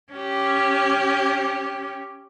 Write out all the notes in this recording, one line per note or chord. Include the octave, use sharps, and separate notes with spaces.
C#4 G4